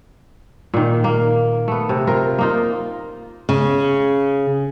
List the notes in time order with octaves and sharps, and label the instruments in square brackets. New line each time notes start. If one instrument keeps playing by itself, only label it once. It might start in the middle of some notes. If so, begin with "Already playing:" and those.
[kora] A#2 D#3
A#3
A3 B3
C3
F4 A#4
A#3 D#4 F4
[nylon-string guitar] C#3